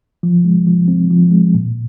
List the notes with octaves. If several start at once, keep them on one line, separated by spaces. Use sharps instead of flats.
F3
G#3
F3
C4
F3
G#3
A#2